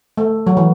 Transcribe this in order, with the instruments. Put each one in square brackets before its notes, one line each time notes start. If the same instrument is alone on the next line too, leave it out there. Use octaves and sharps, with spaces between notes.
[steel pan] A3
F#3
E3